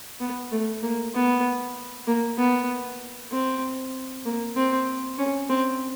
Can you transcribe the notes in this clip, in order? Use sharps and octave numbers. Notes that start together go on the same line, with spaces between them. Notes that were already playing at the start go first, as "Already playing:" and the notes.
B3
A3
A#3
B3
A#3
B3
C4
A#3
C4
C#4
C4